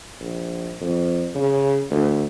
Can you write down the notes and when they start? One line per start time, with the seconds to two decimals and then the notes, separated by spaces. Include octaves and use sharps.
0.20 A#1
0.81 F2
1.35 C#3
1.90 D2